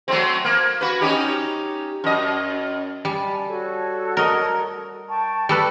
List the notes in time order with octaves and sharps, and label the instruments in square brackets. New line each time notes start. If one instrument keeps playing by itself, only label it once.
[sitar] F#3 A3 C4
A#3
F#4 B4
C#4 D#4 G4
F#2 D#5
[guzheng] G3 [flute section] G#5 A5
[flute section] F#4 A4 C#5
[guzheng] A#4 D#5
[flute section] G5 A5 C#6
[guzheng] G3 A4 B4